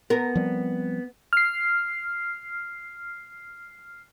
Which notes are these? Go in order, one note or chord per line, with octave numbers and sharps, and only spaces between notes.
B3 A#4
F3 G3 C4
F6 C7